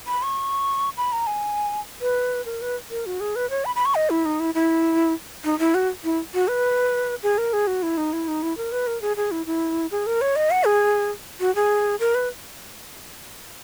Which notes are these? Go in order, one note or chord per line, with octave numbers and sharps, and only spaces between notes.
B5
C#6
B5
A#5
G#5
B4
A#4
B4
A#4
F#4
G#4
B4
C#5
B5
B5
C#6
D#5
E4
D#4
E4
E4
D#4
E4
F#4
E4
F#4
B4
G#4
A#4
G#4
F#4
E4
D#4
E4
D#4
E4
A#4
B4
A#4
G#4
G#4
E4
E4
G#4
A#4
C#5
D#5
F#5
G#4
F#4
G#4
A#4
B4